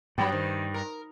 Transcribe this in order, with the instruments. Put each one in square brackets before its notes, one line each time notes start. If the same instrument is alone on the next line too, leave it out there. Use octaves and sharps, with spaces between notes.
[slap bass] G2 [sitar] F#3 B3 [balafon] G5 B5
[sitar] D#3 [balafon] C5
[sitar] A#4